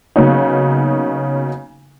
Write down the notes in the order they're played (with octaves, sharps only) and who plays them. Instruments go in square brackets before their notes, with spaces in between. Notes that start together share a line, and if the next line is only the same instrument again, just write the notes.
[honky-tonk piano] C#3 F#3 A#3 B3 C#4 D#4